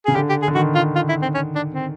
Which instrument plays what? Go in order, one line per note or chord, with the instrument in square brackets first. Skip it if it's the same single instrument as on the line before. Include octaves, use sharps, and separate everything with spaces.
[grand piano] C#3 [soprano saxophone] G#4
[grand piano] D3 [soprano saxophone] G4
[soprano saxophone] G4
G#4
[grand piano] D3
[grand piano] D#3 [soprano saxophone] F#4
[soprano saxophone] F4
F4
E4
C4
C#4
D4
C4